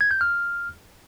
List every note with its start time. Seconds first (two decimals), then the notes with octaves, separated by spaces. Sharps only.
0.01 G#6
0.11 G6
0.21 F6